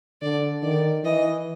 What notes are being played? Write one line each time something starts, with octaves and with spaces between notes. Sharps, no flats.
D3 D5
D#3 D5
E3 D#5